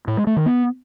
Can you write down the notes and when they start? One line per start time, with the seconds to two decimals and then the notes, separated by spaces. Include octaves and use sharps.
0.08 A2
0.17 G#3
0.27 A3
0.36 D#3
0.46 B3